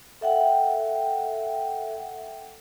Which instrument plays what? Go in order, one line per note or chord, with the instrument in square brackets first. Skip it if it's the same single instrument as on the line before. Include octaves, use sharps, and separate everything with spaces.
[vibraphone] A4 E5 F#5 G5